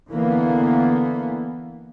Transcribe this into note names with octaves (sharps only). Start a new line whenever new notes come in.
D3 E3 A#3 B3